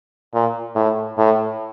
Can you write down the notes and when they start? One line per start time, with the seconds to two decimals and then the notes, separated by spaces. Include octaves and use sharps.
0.34 A#2
0.75 A2
1.18 A2